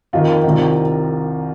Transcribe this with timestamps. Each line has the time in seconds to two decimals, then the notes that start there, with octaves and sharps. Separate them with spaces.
0.13 F2 D#3 F4
0.44 C2 C3 D#3